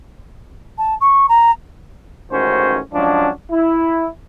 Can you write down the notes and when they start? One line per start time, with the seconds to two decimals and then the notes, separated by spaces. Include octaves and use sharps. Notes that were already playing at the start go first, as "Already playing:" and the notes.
0.77 A5
1.00 C#6
1.28 A#5
2.31 A1 G#2 D#3 C#4 F#4 C5
2.94 F3 F#3 G#3 C#4 D4
3.51 E4